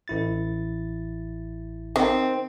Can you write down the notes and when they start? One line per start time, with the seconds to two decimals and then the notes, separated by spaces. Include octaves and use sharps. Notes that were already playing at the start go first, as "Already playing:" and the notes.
0.08 A1 E4 A6
1.96 D#3 C4